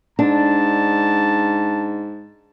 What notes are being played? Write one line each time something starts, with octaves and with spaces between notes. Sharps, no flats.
G#2 D4 A5